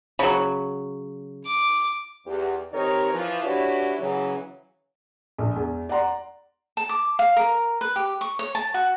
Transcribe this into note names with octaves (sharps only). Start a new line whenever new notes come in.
C#3 F#3
D6
E2 G4
D#3 C4 D#4 G4 A#4 C#5
E3 F3
D4 E4 F#4 G4 B4 C#5
C#3 E3 F#3
A#1
E2
D5 F#5 A#5 C6
A5
D6
F5
A#4
B4
G4
C#6
C#5
A5
F#4